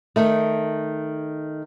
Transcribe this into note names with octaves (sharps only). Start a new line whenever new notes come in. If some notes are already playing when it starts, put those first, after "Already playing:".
D#3 A3